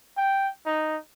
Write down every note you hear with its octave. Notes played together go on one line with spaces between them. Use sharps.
G5
D#4